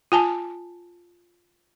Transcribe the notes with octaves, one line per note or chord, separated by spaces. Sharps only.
F4 G#5 A5